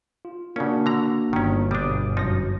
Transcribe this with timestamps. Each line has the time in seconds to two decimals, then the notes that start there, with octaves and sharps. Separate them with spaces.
0.25 F4
0.56 C#3 A#3 C#4 D4 F#4
0.86 D3 A#5
1.33 G1 D#3 C#4
1.71 B2 G3 D4 D6 D#6
2.17 F#2 F3 F#3 D#4 A#6